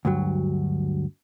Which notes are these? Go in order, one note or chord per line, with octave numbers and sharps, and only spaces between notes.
D2 G2 F#3